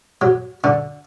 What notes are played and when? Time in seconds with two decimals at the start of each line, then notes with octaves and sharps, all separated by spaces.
0.21 F#3
0.64 D3